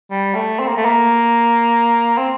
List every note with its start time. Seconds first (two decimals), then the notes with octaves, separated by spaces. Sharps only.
0.11 G3
0.35 A3
0.60 C4
0.68 A#3
0.77 A3
0.85 A#3
2.18 C4